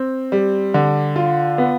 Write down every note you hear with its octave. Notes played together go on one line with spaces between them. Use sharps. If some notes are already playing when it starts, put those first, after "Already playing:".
Already playing: C4
G3
D3
F4
B3